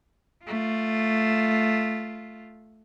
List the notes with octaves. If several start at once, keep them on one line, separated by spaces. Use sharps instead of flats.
A3 F4